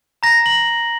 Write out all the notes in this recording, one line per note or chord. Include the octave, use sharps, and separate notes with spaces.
A#5 A#6
F#7